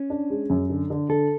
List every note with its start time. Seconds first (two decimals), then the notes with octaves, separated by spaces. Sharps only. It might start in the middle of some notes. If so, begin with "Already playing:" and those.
Already playing: C#4
0.10 D4
0.30 G#3
0.50 F#2
0.70 D3
0.90 D3
1.09 D3 A4